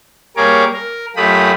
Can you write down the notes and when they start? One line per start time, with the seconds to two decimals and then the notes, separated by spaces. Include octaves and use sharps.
0.37 G3 A#3 G#4 A#4 C#5 D6
0.74 A#4
1.16 F#2 A3 F4 G4 B5 D#6